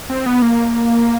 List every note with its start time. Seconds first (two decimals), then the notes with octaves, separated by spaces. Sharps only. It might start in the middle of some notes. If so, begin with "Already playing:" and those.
0.10 C4
0.26 B3
0.42 A#3